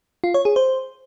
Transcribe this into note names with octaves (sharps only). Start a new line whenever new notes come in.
F4
C#5
G#4
C5